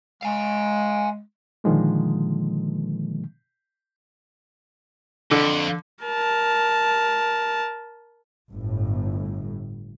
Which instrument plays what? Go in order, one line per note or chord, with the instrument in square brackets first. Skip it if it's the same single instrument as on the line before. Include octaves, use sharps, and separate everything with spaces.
[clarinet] G#3 [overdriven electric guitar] F5 G#5
[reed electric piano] A#2 D3 D#3 F3 G#3 A#3
[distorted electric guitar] F2 [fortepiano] D3
[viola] A#4 A5
[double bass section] G1 A2